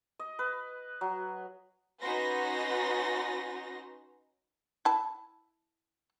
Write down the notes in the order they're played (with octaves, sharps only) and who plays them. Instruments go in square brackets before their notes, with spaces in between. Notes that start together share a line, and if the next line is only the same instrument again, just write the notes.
[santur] D#5
B4
F#3
[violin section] C#4 D#4 F#4 B4 C6 A#6
[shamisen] E4 A5